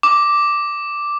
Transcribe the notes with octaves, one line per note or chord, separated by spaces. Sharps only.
D6